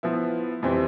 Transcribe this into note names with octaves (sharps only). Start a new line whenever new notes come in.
F3 B3 E4
F2 E3 G3 C4